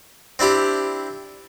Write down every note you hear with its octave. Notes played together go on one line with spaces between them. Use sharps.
C4 D4 E4 G4